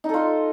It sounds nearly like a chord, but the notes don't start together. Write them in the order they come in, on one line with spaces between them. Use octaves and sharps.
D#4 A4 F4